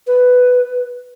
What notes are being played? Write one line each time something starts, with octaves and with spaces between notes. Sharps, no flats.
B4